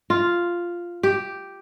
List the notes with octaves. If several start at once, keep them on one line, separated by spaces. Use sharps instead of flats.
F4
G4